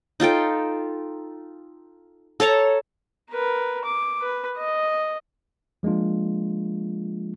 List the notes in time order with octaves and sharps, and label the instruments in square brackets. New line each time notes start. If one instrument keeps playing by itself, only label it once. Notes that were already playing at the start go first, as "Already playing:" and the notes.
[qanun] D#4 F4 A4 G5
A4 C#5 A5 A#5
[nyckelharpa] A#4 B4
D6
B4
D#5
[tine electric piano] F3 G#3 A#3 D4 F4